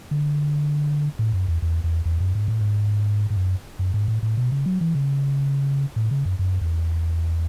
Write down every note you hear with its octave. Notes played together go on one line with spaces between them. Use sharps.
D3
A2
F#2
E2
E2
E2
E2
F#2
G#2
A2
G#2
G#2
F#2
F#2
G#2
A2
A2
B2
C#3
F#3
E3
C#3
A2
C#3
F#2
F#2
E2